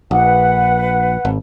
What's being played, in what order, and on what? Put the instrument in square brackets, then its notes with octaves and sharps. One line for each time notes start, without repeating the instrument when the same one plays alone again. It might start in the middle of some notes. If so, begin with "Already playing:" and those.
[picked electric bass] A#1 [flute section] B4 F#5
[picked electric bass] G#1